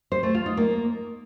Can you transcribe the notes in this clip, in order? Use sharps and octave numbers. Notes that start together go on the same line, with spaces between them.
C5
A3
F4
D#4
A#3